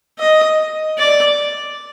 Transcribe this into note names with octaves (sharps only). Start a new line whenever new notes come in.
D#5
D5